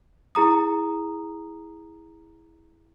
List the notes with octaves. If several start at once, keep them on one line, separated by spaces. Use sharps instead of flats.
E4 G#4 A#5 D#6